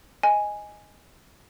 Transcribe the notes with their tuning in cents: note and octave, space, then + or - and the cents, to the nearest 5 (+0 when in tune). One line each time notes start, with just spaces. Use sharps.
D#5 +0 G#5 +0